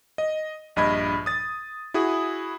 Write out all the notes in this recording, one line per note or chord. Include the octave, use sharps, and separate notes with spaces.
D#5
A#1 G2 D#5 B5 G#6
D#6 A6
E4 F#4 G#4 D#6